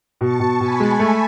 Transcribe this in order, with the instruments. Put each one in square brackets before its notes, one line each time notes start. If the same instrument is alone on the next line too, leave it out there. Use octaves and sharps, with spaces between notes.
[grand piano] B2 [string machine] A5 C#6
[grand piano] B2
[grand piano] B2 [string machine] G#5 B5
[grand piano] G#3
A3